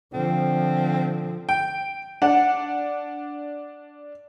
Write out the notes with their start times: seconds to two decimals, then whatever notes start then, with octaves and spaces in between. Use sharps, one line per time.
0.13 D3 F3 C4
1.49 G5
2.22 D4 F#5